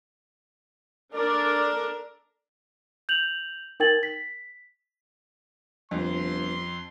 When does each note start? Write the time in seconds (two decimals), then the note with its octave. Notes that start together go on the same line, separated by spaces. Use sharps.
1.14 D4 A4 A#4 D5
3.09 G6 F7 F#7
3.80 D#4 A#4 G5 G#6 A6 F#7
4.03 B6
5.91 G1 F2 C6